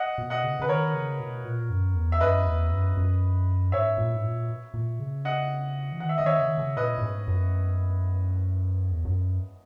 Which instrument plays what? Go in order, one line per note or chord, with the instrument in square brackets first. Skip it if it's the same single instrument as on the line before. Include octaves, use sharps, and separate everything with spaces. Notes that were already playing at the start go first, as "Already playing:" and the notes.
Already playing: [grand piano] D#5 F#5
[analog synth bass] B2
[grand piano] D#5 F#5
[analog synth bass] C#3
[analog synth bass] C#3 [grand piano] B4
[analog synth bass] D#3 [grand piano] A#4 C#5
[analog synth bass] C#3
B2
A#2
F#2
E2
[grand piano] E5
[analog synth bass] F#2 [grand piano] B4 D#5
[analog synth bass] E2
F#2
F#2
[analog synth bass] G#2 [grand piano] C#5 E5
[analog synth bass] A#2
G#2
A#2
A#2
C#3
[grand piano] D#5 F#5
[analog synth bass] E3
[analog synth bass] D#3 [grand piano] F#5
[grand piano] E5
[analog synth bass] D#3 [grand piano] D#5
[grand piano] C#5 E5
[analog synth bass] C#3
D#3
C#3
[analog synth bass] A#2 [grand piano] B4 D#5
[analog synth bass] A#2
G#2
F#2
E2
F#2